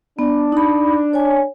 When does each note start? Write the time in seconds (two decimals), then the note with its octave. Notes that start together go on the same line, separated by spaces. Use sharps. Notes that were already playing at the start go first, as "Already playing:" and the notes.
0.19 B3 D4
0.52 D#4 B5
1.13 C#5 G#5